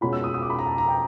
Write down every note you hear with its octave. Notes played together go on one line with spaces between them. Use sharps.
B2 G#3 C#4 F4 B5
E6
D#6
D#6
D6
B5
A#5
A5
A#5
G5